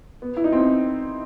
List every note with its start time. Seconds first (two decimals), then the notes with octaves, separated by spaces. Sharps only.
0.22 B3
0.37 E4
0.44 D#4
0.53 C4